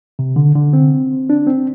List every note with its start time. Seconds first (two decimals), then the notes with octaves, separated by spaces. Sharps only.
0.19 C3
0.36 D3
0.55 D3
0.73 C4
1.30 D4
1.47 C4